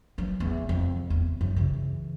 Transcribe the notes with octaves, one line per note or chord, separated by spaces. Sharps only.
E3 F#3
E2
F2
E2
F#2
C#3 E3